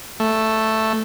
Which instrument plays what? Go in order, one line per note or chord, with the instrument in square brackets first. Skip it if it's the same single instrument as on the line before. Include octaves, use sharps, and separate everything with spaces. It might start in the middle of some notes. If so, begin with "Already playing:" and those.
[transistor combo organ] A3